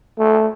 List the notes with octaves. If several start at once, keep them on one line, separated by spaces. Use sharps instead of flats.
A3